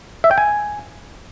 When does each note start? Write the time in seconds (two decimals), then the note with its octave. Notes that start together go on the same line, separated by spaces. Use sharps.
0.24 E5
0.31 G5
0.38 G#5